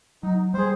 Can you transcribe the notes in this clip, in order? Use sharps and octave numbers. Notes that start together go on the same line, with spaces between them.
F#3 D#4
G3 G#4 C5